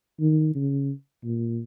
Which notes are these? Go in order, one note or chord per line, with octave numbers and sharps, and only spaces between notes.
D#3
C#3
A#2